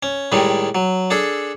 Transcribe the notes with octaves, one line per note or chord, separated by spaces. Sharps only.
C#4
A2 D#3 G3 G#3
F#3
D4 G#4 A4